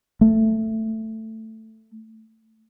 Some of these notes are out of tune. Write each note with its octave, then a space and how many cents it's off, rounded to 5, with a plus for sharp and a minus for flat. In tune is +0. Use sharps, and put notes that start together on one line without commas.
A3 +10